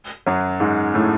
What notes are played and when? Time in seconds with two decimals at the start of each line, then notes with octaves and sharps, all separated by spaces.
0.27 F#2 F#3
0.60 G#2 G#3
0.94 A2 A3